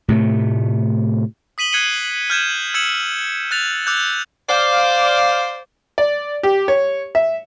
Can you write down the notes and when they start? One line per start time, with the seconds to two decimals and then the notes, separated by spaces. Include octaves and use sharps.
0.08 A2 C3 A3
1.58 D#6 B6 D#7 F#7 G7
1.72 F#6 G#6 C7 C#7 D#7 G7
2.30 F6 G6 G#6 E7
2.74 E6 G#6 C#7 E7 F#7
3.51 F#6 A6 F7
3.87 D6 E6 F#6 G6
4.49 C5 D5 F5
5.98 D5
6.43 G4
6.68 C#5
7.15 E5